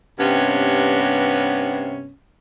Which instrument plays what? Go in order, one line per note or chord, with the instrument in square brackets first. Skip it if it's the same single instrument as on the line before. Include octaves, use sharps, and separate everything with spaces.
[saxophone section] G2 C3 B3 C#4